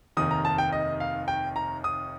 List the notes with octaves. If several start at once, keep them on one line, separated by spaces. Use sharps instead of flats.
F1 D#2 D#3 D#6
A#5
A5
G5
D#5
F5
G5
A#5
D#6